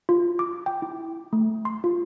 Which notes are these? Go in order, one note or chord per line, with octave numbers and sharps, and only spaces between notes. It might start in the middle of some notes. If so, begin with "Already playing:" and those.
F4
D6
G5
E4
A3
C6
F4